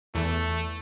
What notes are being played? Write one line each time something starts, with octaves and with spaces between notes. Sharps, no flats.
E2 E3 A3